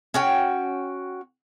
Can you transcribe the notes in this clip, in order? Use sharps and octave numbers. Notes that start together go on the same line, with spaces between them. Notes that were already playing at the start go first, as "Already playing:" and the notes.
C#4 F#4 G5